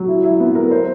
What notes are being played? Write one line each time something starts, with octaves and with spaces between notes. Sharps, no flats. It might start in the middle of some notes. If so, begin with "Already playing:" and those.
Already playing: F#3
E4
E4
B3
A#4
C5